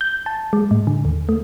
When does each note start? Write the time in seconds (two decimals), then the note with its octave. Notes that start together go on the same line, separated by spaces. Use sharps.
0.01 G6
0.26 A5
0.53 G#3
0.71 A2
0.87 D3
1.05 D#2
1.29 A3